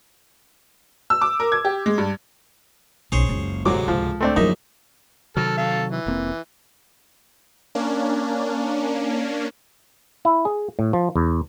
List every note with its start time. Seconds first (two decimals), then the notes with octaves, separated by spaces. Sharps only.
1.10 E6
1.22 D6
1.40 A#4
1.52 G#6
1.65 G4
1.86 G#3
1.98 G2
3.12 B1 C#3 G#4 C5 C#5
3.29 F#1 C#2
3.66 D2 G#2 C3 F#3 D6
3.88 C#2 F3
4.21 A3 C4 D4
4.36 A#1 F#2 D3 D#4 E5
5.37 C3 D#3 F#3 A4 F6
5.58 A4 F5
5.92 E3
6.06 F1 A#3 C4
7.75 A#3 C#4 D4
10.25 E4
10.45 G#4
10.79 A2
10.93 F3
11.16 E2